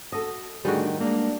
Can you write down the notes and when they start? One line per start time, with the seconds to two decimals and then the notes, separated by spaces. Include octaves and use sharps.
0.12 F#4 A4 D#5
0.65 A2 D3 D#3 G3 F#4 G#4
1.00 G#3 A#3 D4